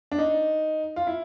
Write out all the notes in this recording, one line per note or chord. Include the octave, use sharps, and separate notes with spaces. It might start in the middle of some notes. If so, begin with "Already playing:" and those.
D4
D#4
F4
E4